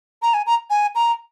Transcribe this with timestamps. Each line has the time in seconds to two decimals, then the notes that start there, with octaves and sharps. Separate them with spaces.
0.22 A#5
0.34 G#5
0.46 A#5
0.70 G#5
0.95 A#5